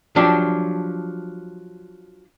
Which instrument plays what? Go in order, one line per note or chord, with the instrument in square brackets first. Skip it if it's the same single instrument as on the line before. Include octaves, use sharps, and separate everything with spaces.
[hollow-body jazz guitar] F3 F#3 D4 G4